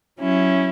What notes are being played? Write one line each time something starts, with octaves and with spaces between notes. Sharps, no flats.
F#3 C#4 E4